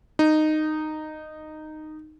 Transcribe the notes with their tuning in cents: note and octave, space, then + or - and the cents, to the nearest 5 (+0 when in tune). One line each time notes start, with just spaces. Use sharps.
D#4 -10